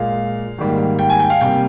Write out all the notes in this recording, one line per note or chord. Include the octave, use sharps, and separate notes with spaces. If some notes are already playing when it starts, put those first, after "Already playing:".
Already playing: A#2 G#3 F5
G#2 D#3 G3 A#3
G5
G#5
G5
F5
C3 G3 A#3 G5